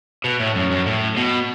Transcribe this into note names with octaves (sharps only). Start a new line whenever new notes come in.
B2
A2
F#2
F#2
A2
B2